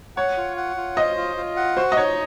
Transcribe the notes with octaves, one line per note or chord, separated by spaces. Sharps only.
C#5 F#5
F4
F#5
F4
C5 D#5
F4
F4
F#5
F#4 C5
D#5
D#4 C#5